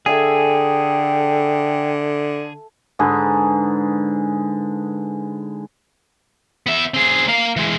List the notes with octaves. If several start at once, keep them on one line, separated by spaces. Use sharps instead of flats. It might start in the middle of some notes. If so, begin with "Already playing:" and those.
D3 G#4 A4 E5 G5 G#5
G#2 D3 G#4 B4
B3 E5
C4 G#4
A#3 F5
E3 G#3